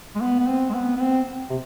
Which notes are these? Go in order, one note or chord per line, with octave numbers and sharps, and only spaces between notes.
G#3
B3
B3
C4
G#3
B3
B3
C4
C3